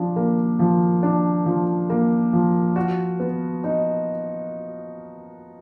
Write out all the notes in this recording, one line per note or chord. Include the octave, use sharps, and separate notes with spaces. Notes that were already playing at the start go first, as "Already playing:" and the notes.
Already playing: F3 D4
A#3
F3
D4
F3
A#3
F3
F#4
B3
D#4